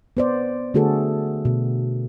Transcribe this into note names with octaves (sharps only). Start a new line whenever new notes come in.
B3 C5 D5
D3 A3 F#4 G#4 A4
B2